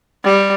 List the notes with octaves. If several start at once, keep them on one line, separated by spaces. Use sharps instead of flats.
G3